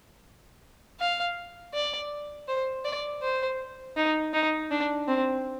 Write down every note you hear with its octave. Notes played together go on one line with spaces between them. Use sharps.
F5
D5
C5
D5
C5
D#4
D#4
D4
C4